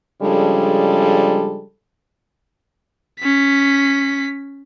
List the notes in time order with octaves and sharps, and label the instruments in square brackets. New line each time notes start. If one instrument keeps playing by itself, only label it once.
[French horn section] C#3 F3 G3 G#3 D4 A4
[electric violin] C#4 B6